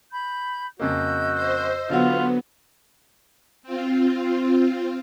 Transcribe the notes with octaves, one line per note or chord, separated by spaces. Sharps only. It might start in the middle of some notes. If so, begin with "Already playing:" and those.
B5 G6
F2 C#3 A#3 F#4 D#5 E6 G6
C5
D3 F#3 B3 F4 F#4
C4 F4